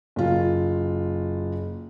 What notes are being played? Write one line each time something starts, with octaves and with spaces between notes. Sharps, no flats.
F#1 F4